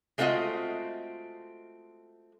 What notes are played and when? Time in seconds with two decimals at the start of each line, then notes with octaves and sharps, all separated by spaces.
0.18 G#3 A3 C4 F4 F#4 D#5